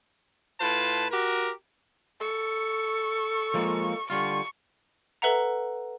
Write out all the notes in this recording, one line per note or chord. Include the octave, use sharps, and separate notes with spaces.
A2 F4 B4 A5
F#4 G4 A#4
A4 C#6
F3 G#3 A#3
D3 G3 F4 C#6
A4 B4 E5 F#5 A#5